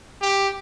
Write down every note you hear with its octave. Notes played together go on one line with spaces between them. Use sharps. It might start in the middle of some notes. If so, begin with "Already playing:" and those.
G4